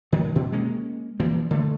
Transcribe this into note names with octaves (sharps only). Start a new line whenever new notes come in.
D#3 F#3 A3
B2
G#3 A#3 C#4
E3 F3 G3 A#3
D3 A3